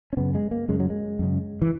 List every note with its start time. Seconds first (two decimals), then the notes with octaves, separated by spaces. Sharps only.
0.13 C#4
0.17 F#2 C#3 B3
0.35 G#3
0.51 A#3
0.68 F#2 C#3 G#3
0.80 F#3
0.90 G#3
1.19 F#2 C#3
1.62 E3